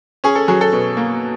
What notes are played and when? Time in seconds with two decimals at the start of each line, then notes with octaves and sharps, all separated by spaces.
0.24 C#4 G#4
0.35 A4
0.48 F#3 G#4
0.61 A4
0.73 B2
0.97 A#3